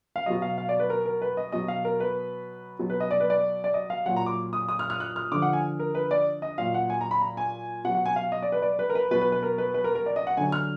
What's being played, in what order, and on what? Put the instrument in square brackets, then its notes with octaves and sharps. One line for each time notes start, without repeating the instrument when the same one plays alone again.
[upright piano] F5
B2 F#3 D#5
F5
F5
D5
B4
A#4
A#4
B4
D#5
B2 F#3 D#5
F5
A#4
B4
B2 F#3
B4
D#5
D5
B4
D5
D5
D#5
F5
A#2 F#3 F#5
A#5
D6
D#6
D#6
F6
F6
F#6
F6
D3 F3 D6
F#5
G#5
A#4
B4
D5
D#5
A#2 F#3 F5
F#5
G#5
A#5
B5
A#5
G#5
B2 F#5
F#3
F#5
G#5
F5
D#5
D5
B4
D5
B4
A#4
B4
B2 F#3 B4
B4
B4
A#4
B4
B4
A#4
A#4
D5
D#5
F#5
D3 F#3 G#5
F6